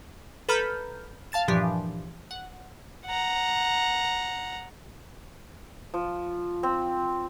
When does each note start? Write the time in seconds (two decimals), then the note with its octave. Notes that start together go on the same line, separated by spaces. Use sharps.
0.49 A4 B4 A#5 B5 F6 G6
1.32 F5 A5 A6 E7
1.48 G2 A#2 E3 F3 D4 G4
2.31 F#5
3.06 F#5 A#5
5.94 F3
6.63 C4